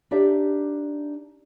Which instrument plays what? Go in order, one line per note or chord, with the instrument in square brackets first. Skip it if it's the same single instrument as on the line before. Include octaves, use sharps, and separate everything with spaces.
[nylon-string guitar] D4 D#4 G4 D5 E5